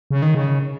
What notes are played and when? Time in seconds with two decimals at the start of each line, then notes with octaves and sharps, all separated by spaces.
0.11 C#3
0.22 D#3
0.35 C#3